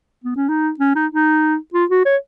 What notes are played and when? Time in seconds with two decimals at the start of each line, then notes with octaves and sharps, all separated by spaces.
0.24 B3
0.36 C#4
0.49 D#4
0.80 C#4
0.96 D#4
1.12 D#4
1.74 F4
1.90 F#4
2.05 C#5